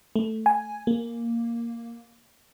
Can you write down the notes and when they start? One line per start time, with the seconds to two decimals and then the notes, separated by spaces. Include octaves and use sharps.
0.16 A3
0.46 G#5
0.87 A#3